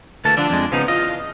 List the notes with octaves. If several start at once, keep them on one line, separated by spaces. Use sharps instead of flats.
D2 D3 E3 A#3 A4 A5
D3 F3 D4 A4
F2 G#3
C#3 F3 B3 D#4
E2 F4 D#5